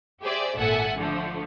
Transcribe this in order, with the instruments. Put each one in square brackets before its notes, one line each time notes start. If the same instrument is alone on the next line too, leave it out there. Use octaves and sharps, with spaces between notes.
[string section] G4 G#4 C5 D5 E5
G#1 A#2 A4 E5 F#5 G#5
D3 F3 A3